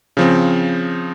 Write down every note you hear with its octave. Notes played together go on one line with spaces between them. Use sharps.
C#3 F3 C4